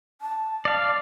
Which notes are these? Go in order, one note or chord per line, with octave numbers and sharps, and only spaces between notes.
A5
D5 F5